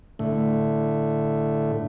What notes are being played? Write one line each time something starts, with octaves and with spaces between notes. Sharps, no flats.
A2 D3 A3